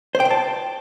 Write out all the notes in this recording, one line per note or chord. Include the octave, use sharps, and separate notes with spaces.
C5
G5
C5
A5